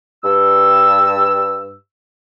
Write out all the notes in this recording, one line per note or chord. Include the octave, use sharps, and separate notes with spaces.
G2 E6